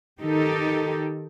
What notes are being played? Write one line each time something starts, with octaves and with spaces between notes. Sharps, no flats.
D#3 D#4 G4 A4